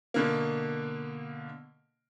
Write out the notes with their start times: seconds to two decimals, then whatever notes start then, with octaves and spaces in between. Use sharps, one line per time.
0.14 B2 D3 A#3